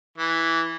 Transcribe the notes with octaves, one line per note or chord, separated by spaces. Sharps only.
E3